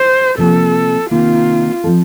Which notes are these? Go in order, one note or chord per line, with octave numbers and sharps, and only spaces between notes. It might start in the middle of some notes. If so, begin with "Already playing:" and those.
Already playing: C5
C3 F3 A#3 A4
C3 D#3 A#3 F4
F3 C4 F4 A4